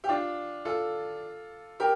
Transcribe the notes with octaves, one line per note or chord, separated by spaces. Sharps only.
G4
D4 F4
F4 A4
G4 A#4